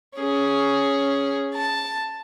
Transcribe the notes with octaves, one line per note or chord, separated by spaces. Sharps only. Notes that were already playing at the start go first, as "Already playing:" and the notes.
C#4 G#4
A5